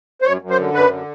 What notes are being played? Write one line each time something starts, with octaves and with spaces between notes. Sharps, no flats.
C5
F#2 C#5
F#2
C5
D3
F#2 B4
D3